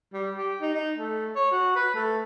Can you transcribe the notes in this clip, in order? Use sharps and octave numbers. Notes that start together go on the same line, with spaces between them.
G3
G4
D#4
D#4
A3
C#5
F#4
B4
A3